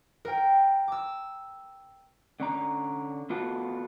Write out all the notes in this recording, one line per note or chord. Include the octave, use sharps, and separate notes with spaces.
A#4 G5
D6 E6
D3 C#4 A#5
B3 F4 F#4 A4